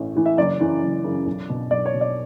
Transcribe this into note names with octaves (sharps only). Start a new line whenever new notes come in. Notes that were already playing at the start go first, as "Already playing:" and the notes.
Already playing: A1 A2 E3
A2 E3
E5
F#1 D5
F#2 C#3 E3
F#1
F#2 C#3 E3
B1
B2
B1 D5
C#5
B2
D5